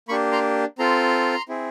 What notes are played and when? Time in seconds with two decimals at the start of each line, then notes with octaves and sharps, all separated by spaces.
0.08 A#3 D4 G4 B5 C#6
0.32 A#5 C6
0.78 C4 F4 A4 A#5 C6
1.49 C4 E4 G#4